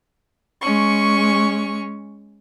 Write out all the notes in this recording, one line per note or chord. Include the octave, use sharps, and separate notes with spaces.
G#3 C#4 C#6